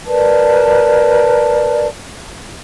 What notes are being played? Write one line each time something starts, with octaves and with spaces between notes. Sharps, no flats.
A#4 B4 D5 A5